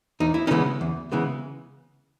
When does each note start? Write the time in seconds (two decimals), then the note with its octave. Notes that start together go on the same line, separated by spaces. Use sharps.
0.20 E2 D#4
0.34 E4
0.47 C#4 D#4
0.51 C#3 E3 G#3 B3
0.81 E2
1.12 C#3 E3 G#3 B3